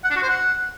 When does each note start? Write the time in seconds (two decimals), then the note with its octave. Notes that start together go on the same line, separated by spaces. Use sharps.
0.04 F#5
0.10 D4
0.16 F#4
0.23 C5
0.29 F#5